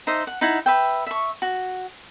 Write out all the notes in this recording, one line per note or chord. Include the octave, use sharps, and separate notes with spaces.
D#4 C5 D#5 E5
F#5
D#4 E4 F#5
B4 E5 G5
E5 C#6
F#4